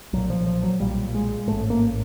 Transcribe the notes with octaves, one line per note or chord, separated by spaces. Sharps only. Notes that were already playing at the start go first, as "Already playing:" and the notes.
B1 A#2 F#3
F3
F3
F#3
B1 A#2 G3
G#3
A1 G#2 A3
A#3